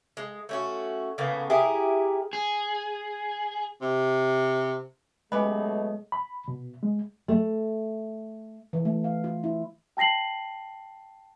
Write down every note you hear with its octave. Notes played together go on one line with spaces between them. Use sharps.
G#3
A3 C#4 F#4
A2 C#3 A#3 B3
E4 G4 G#4 A#4
G#4
C3
B2 F#3 G#3 A3 C#4 G4 B4 D#5
B5
B2
G#3
A3
E3
A3
F5
F4
E4
G5 A5 A#6 C7 F#7